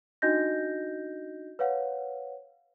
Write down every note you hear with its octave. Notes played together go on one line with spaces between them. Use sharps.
D4 D#4 F#4 D#5 G6 A#6
B4 C#5 F5 F#5